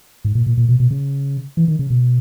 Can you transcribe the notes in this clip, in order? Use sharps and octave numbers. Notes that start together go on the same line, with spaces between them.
G#2
A#2
A#2
A#2
B2
B2
C#3
E3
D#3
C#3
B2